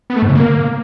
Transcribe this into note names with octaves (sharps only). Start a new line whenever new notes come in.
B3
A3
G#2
C#3
A#3